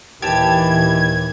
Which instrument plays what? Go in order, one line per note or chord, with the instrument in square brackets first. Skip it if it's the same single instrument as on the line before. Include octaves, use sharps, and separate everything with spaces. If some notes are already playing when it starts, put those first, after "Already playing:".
[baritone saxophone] D#2 [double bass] A#2 E3 [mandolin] G4 A5 [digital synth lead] G#6